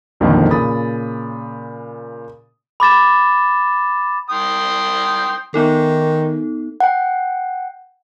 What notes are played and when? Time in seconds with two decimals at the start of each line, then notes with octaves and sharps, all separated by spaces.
0.20 B1 F2 D3 D#3 F3 A#3
0.50 A#2 C#3 B5 D#6 A6
2.80 B5 D6 A6 E7
4.30 G5 C6 D#6
5.54 D#3 B3 D#4 A4
6.80 F#5 G5